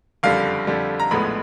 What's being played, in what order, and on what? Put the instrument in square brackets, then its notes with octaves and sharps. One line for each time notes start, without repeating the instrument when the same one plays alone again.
[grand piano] F#1 F2 D3 G3 F5
F2 D3 G3
A#5
A#1 A2 F3 G#3 B3 B5